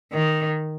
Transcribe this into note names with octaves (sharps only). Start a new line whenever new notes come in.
D#3